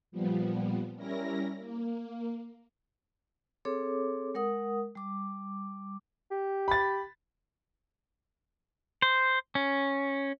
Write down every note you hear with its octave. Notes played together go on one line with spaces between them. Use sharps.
A#2 F3 G3 B3
G3 C#4 E4 A#4 A#6
A#3
C4 G#4 A4 C#5 D6
G#3 A#4 F#5 D#6
G3 D6
G4
B5 A6
C5
C#4